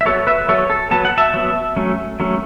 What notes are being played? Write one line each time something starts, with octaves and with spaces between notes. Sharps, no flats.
E5
F#3 B3 A4 C#5
B4 E5
F#3 B3 A4 C#5
A4
F#3 B3 A5
F#5
E5 A5
F#3 B3
F#3 A3 C#4
F#3 A3 C#4